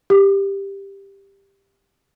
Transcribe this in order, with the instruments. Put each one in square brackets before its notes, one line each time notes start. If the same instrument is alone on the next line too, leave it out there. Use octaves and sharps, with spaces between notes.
[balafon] G4